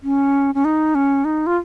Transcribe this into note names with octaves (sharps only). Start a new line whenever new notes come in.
C#4
C#4
D#4
C#4
D#4
F4